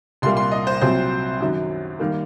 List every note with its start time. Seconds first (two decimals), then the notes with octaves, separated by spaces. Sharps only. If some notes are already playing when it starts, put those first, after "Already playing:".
0.22 C2 A#2 G3 A#3 C6
0.37 C6
0.52 D#5
0.67 C5
0.81 C2 A#2 F#3 C4 C5
1.40 F#2 D#3 F#3
2.00 D#3 G3 A#3